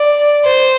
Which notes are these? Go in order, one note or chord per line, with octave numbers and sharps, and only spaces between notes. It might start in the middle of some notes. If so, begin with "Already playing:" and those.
Already playing: D5
C5